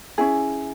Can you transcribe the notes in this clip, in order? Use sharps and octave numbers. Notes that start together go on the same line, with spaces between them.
C#4 E4 G#4